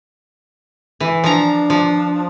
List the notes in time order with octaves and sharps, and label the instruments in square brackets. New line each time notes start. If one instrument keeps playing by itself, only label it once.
[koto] E3
[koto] F3 A#5 [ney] D4
[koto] F3